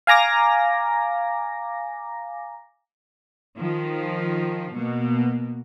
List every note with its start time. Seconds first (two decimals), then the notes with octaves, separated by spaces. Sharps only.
0.07 F5 G#5 A#5 D6 A#6
3.57 D#3 F3
4.74 B2 A#3